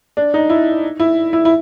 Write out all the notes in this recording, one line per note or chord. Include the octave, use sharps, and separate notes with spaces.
D4
D#4
E4
E4
E4
E4